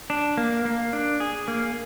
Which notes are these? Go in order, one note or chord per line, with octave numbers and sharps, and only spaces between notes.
D4
A#3
A#3
D4
G#4
A#3